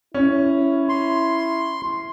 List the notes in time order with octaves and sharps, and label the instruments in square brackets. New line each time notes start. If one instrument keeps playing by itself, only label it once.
[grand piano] C#4 [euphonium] E4
[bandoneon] C6